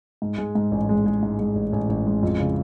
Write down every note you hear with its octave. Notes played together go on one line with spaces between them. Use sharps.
G#2
G#3
G#2
A1
G#3
G#3
G#2
G#3
A1
A1
A1
G#3
F2
C#3